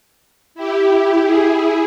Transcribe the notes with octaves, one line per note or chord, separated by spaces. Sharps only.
E4 G4
E4 G#4